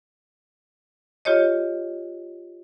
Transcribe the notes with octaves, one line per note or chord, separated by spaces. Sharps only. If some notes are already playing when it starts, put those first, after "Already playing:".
F4 G4 C#5 D#5